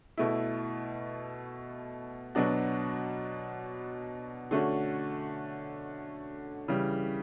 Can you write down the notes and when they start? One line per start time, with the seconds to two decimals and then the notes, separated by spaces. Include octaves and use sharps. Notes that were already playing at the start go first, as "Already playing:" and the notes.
0.17 B2 A3 E4
2.35 B2 F#3 B3 D4 F#4
4.51 D3 A3 C#4 F#4
6.68 C#3 E3 G3